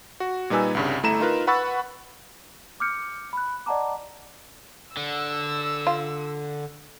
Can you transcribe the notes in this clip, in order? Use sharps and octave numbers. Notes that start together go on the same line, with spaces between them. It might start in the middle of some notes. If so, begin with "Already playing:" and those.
F#4
A#2 G3 D#4 B4 G#5 E6
C2 G2 C#3
G1 A3 E4 A#5 E7
D#4 F4 A#4 B4
B4 F#5 B5 C#6 E6 A6
D6 E6 F6 G6 C#7
B5 F#6
D5 D#5 F#5 A5 A#5 D6
D3 E6
F4